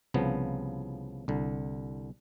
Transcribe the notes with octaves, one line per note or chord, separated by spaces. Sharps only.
C2 C#3 F3 B3
C2 D3